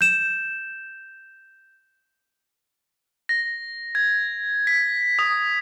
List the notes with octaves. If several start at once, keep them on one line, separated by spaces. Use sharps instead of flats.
G6 E7
A#6
G#6
B6
D#6